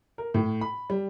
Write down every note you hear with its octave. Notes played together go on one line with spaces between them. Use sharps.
A#4
A2
B5
G3